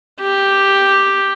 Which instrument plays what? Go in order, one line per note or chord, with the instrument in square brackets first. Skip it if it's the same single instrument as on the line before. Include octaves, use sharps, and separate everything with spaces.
[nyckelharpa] G4